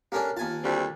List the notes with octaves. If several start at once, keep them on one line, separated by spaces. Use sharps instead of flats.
A#3 C#4 D4 G4 A4
D#2 F4 G#5 A5
D2 G3 C4